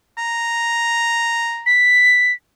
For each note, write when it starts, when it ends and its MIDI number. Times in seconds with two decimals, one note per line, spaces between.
0.18 1.72 82
1.66 2.32 95